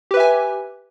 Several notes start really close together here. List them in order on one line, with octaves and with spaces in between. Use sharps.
G4 B4 E5 G#5